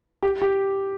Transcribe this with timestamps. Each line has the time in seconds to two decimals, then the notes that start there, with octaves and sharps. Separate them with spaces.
0.23 G4
0.42 G4